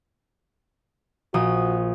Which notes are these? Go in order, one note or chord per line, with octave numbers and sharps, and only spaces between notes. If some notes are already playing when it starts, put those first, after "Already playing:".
A#1 F#4 D#6